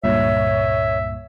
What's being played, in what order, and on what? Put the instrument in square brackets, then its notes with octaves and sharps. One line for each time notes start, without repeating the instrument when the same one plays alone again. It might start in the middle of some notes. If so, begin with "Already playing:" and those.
[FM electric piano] C#2 G2 A#2 [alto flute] C#5 [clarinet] E5